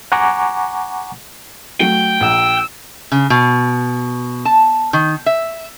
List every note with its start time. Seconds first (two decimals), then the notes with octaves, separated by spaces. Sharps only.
0.12 F#5 G#5 A#5 C#6 D6
1.80 F#3 A3 G5
2.20 A#1 E6
3.12 C#3
3.30 B2
4.45 A5
4.93 D#3
5.26 E5